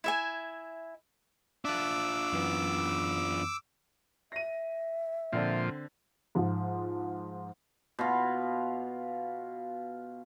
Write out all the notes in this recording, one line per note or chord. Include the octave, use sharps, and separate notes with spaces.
E4 E5 G#5
D4 F4 E5 A5 D6 E6 F#6
F#2 E3 B3
E5 A#6 D#7
A#2 D3 F3 C4
G#2 F3 F4
B2 F4